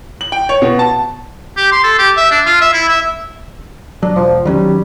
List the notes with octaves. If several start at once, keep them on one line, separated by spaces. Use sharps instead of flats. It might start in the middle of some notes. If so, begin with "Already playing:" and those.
F#7
G5
C#5
B2
A5
G4
C6
A4
G4
E5
D4
F4
E5
E4
E5
F#3 D4
E1 F3
D#3 F#3 G3 C#4